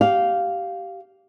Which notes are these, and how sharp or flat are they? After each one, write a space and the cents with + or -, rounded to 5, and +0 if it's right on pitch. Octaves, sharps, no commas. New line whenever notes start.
G4 -20 F5 +0